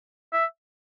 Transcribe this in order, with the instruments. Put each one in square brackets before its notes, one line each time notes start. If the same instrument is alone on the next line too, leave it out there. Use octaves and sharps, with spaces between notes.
[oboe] E5